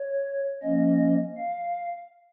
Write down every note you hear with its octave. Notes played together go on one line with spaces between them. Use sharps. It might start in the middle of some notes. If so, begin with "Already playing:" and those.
Already playing: C#5
F3 A#3 C#4 D#5
F5